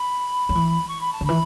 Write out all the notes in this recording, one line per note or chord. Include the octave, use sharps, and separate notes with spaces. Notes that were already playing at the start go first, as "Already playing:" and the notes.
Already playing: B5
F#3
E3
C#6
B5
A5
D3
E3 B5